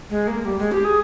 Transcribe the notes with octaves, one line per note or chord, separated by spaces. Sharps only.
G#3
A#3
G3
G#3
G4
G#4